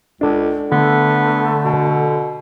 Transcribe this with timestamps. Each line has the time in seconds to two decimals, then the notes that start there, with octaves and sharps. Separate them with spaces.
0.21 C#2 D4 A4
0.72 D3 A3 B3
1.64 B2